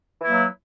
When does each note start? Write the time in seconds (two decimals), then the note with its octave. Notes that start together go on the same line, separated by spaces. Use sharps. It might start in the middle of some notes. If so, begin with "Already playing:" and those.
0.20 E3
0.24 E4
0.27 A#3
0.31 F#3